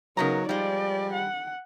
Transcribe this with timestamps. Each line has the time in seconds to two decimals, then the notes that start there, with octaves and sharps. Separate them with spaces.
0.17 C#3 F#3 B3 D#4 A#4 A#5
0.49 F3 G3 G#3 D5
1.13 F#5